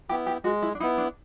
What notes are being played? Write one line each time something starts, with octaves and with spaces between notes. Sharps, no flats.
B3 E4 G4
G4
G#3 F#4
E4
D4
B3 D#4 E4
D4